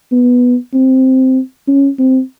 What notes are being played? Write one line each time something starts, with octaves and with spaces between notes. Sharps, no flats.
B3
C4
C#4
C4